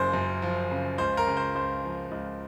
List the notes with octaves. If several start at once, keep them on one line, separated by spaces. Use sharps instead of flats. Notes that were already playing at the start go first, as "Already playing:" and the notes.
Already playing: F#1 F#2 C#3 F3 C5
F#2
F3
C#3
C#2 C5
A#4
C#3
C5
C#2 C5
F3
C#2